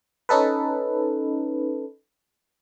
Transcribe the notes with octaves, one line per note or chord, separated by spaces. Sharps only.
C#4 D#4 A4 B4